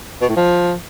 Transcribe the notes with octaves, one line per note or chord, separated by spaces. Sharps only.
B2
A2
F3